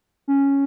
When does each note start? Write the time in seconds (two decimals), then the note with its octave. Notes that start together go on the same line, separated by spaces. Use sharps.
0.28 C#4